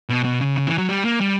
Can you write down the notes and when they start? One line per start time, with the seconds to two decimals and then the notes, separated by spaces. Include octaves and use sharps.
0.09 B2
0.25 B2
0.41 C#3
0.58 C#3
0.67 E3
0.78 F#3
0.89 G3
1.05 A#3
1.21 G3